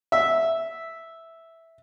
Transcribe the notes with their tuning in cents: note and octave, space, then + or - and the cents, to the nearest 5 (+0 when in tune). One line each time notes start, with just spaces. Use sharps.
E5 -5